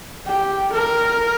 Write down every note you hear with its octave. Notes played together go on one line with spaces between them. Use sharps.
G4
A#4